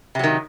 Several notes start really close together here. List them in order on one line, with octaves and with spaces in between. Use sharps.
C3 F#3 D#3